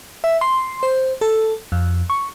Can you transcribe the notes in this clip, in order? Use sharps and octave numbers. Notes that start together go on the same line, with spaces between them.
E5
C6
C5
A4
F2
C#6